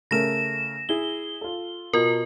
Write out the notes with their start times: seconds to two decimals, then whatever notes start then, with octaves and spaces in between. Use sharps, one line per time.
0.11 C#3 A3 A#4 A#6 E7
0.89 E4 G#4 G7
1.41 F4 A4
1.93 B2 F4 A#4